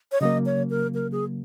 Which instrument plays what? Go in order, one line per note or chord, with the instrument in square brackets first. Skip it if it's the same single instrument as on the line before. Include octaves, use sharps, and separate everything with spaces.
[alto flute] C#5
[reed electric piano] C#3 F#3 A#3 [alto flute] D#5
[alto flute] C#5
A#4
A#4
G#4